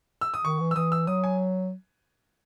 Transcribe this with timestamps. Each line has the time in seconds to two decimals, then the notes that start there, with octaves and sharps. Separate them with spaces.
0.21 E6
0.34 D#6
0.44 D#3 C#6
0.60 E3
0.71 E6
0.76 E3 D#6
0.92 E6
1.07 F#3 D#6
1.24 G#5